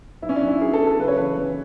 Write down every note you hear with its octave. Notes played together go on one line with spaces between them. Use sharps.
B1 E4
C#4
D4
B1
E4
F#3 G#4
A4
F#3
A4
C#3 B4
C#5
E3 B4
E3